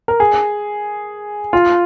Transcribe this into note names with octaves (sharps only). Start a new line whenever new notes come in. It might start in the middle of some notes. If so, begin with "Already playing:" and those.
A#4
G#4
F4